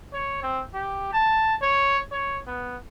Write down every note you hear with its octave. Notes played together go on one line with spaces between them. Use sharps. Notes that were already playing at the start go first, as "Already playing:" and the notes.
C#5
C4
G4
A5
C#5
C#5
B3